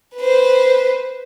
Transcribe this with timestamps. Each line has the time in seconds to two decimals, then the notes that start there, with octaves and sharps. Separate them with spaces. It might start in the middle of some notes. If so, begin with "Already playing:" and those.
0.17 B4 C5